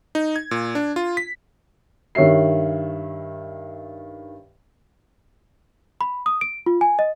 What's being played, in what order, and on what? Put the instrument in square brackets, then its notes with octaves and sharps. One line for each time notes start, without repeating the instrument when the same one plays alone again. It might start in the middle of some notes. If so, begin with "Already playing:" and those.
[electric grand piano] D#4
G#6
A#2
D4
F4
B6
[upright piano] G2 D#3 C#5 E5 C7
[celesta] B5
D#6
D7
F4
G#5
D#5